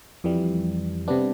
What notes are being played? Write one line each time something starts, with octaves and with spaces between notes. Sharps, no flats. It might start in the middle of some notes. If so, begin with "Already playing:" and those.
F2 E3 G3
C3 G3 B3 D4